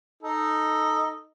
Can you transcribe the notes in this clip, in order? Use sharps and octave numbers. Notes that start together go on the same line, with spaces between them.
D#4 A4